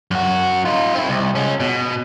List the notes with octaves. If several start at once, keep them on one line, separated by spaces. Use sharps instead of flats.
F#2 F#4
D#4 F4
C4 E4
C2
G#3 C#4
B2